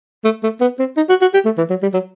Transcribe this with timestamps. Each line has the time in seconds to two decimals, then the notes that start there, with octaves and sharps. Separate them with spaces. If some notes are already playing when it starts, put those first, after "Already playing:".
0.24 A3
0.43 A3
0.60 B3
0.79 C4
0.97 D#4
1.09 F#4
1.21 F#4
1.34 G4
1.45 A3
1.57 E3
1.70 F#3
1.82 G3
1.93 F#3